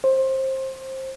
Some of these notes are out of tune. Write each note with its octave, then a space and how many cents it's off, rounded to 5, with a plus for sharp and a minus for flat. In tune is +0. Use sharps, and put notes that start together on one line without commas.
C5 +20